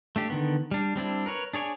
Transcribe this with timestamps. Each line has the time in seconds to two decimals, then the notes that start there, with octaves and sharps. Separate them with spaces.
0.16 A3 D4 G4
0.30 D3 D#3 B3
0.71 G3 D4
0.96 G3 C4 D4 E4
1.26 A#4 B4 C#5
1.53 D4 G#4 C#5 D5 G#5